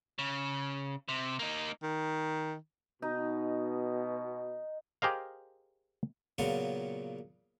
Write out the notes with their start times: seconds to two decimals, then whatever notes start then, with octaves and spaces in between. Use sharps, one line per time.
0.19 C#3
1.08 C3
1.39 A#3 D#4
1.83 D#3
3.02 B2 D#4
5.02 G4 G#4 A#4 C5 D#5 F5
6.38 A#2 C#3 F#3 B3 F4 A#4